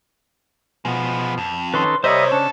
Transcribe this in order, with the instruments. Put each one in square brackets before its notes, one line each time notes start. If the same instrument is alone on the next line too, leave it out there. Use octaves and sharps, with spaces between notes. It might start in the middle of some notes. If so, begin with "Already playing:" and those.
[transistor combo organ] B2 F3 [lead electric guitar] G#3 B3
[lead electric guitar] F2
[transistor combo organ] D#3 C#4 A4 [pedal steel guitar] B4 C6
[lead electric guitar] C3 [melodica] G3 D#5 E5 [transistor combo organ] A#4 D#6 [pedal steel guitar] C5 C#5
[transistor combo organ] C#3 C#4 [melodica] D4 [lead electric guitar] A4